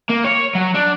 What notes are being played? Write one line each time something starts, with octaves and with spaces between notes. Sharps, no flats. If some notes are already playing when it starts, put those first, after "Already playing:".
A#3
C#5
F#3
D4